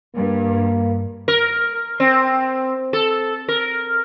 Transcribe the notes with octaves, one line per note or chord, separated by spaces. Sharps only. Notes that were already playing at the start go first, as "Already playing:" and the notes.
G2 A#3
A#4
C4
A4
A#4